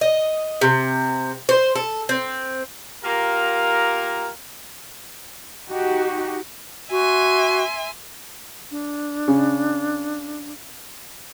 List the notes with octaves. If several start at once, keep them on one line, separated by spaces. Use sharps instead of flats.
D#5
C3
C5
A4
C4
A#3 F4 G4 A#4
D#4 F#4 G4
F#4 E5 G#5 C6
D4
C#3